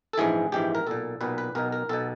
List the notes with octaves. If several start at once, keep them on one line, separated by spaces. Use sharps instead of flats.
A4
A#1 G#2 E3 G#4
A#1 G#2 E3 G4
A#4
B1 A#2 A4
B1 A#2 B4
B4
B1 B2 A#4
A#4
B1 B2 A4